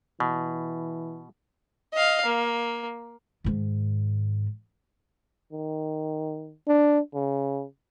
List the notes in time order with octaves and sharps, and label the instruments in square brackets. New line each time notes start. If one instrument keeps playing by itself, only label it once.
[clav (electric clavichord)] B2 [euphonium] E3
[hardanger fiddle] D#5 F5
A#3
[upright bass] G#2 D#3
[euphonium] D#3
D4
C#3